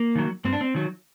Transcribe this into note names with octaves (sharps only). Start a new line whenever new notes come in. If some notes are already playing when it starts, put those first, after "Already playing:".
Already playing: A#3
D#3 F#3
G2 C4
D4
C4
D#3 F#3